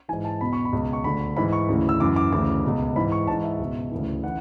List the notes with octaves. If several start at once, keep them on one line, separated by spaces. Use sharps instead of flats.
G#2 E3 G#5
A5
E2 B2 B5
C#6
B5
C#2 B2
C#6
D2 D3 B5
G#2 E3 B5
C#6
D2 C#3 E3
E6
F#2 E3 D6
D6
D2 C#3 E3 D6
C#2 B2
G#2 E3 B5
C#6
G#2 E3 A5
E5
C#2 B2
D2 C#3 E3
C#3 E3 F#5